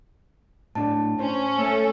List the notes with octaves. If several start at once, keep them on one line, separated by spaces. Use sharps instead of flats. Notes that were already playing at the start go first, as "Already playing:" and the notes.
A2 D4 A5
C#4 C5
A3 A4